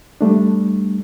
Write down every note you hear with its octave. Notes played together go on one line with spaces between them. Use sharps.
G3 A3 D4